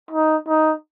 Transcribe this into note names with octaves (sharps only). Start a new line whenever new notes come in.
D#4
D#4